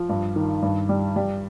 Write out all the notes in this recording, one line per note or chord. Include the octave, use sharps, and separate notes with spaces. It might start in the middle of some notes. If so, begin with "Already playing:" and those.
Already playing: F3
G2
D#3
G2
G3
G3